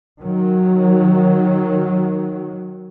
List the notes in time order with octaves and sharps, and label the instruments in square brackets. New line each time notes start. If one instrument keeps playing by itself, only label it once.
[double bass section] D#3 F#3